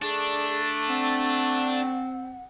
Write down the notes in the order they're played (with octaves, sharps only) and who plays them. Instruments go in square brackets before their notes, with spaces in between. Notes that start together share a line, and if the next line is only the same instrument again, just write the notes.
[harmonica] A3 A5 [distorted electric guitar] D4 [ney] G#4
[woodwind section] C4 [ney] F#5